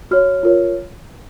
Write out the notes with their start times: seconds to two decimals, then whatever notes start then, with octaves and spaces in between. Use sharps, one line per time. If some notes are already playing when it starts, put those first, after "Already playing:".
0.11 F#4 C#5 F6
0.43 F4 A#4 C#5